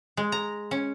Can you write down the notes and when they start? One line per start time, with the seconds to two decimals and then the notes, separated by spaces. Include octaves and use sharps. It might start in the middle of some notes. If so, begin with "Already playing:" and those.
0.17 G#3
0.32 A#5
0.71 C#4